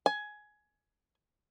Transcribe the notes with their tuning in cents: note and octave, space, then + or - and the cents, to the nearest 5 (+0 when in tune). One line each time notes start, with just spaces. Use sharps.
G#5 +15